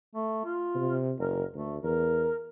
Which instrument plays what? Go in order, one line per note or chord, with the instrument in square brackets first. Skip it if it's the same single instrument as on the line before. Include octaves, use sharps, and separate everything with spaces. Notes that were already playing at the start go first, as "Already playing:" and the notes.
[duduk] A3
F4
[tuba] C3
[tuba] F#1 [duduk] A#4
[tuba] D2 [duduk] A3
[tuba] E2 [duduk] A#4